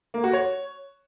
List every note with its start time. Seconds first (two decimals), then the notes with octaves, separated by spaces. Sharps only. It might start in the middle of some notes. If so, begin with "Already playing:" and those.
0.14 A#3
0.24 F#4
0.33 C#5